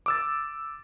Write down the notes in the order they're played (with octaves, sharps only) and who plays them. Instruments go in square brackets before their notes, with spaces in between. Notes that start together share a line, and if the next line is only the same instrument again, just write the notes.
[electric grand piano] D6 E6 A6